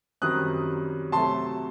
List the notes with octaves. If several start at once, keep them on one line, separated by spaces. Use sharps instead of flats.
F#2 D#3 G3 C4 D#6 F#6
C3 F#3 A3 A5 C6